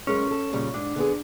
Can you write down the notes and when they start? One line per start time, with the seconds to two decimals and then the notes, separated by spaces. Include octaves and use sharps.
0.07 F#2 G#3 C#4 A#4
0.27 A4 A#4
0.53 A#2 C#3 G3
0.74 G#2 D4
0.96 D3 B3 G#4